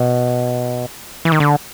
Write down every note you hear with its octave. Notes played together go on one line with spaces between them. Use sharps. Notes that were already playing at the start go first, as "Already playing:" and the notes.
Already playing: B2
E3
D#3
D3